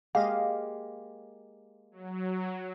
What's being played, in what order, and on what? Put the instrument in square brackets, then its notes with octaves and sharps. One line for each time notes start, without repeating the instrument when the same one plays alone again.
[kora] G#3 A#3 G4 [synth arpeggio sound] D#5 F5
[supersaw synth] F#3